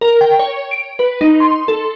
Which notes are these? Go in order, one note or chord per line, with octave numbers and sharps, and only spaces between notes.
A#4
G5
C#5
D7
B4
D#4
C6
A4